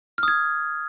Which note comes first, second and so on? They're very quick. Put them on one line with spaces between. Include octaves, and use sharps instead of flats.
F6 D#6 G#6